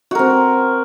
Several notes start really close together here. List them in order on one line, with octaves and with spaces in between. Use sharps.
F#4 A#4 C4